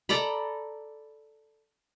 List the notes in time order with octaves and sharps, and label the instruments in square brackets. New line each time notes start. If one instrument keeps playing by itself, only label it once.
[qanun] A4 D5 A#5 B5